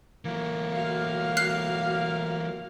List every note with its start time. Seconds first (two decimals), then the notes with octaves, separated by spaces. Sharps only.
0.25 A2 E3 F#3 A#3
0.73 F#4 F5
1.37 F6 F#6 C7